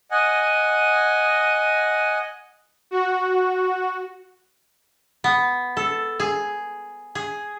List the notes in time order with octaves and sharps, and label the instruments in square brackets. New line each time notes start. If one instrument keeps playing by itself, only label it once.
[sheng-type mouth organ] D#5 F#5 G#5
[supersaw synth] F#4
[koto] B3
A4
G#4
G#4